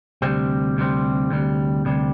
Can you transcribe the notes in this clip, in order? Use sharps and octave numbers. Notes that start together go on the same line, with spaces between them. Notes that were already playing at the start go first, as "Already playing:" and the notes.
D2 C3 G3 C4
D2 C3 G3 C4
D2 C3 G3
D2 C3 G3